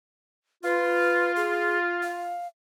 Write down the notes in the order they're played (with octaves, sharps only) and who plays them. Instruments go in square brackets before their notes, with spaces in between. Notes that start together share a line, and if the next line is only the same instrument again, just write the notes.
[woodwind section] F4 [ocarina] B4
[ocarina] G#4
F5